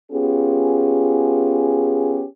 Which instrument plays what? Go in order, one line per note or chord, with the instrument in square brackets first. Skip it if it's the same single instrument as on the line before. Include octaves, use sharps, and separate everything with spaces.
[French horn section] B3 C#4 F4 G4 G#4